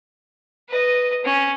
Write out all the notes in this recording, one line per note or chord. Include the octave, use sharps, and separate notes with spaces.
B4 D#5
C#4